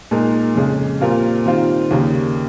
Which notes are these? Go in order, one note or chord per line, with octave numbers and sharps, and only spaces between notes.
A#2 G#3 D#4 A#4
F2 C#3 G#3
A#2 G3 C4 F4 A#4
D#3 G3 C4 F4
D#2 C#3 G3 A#3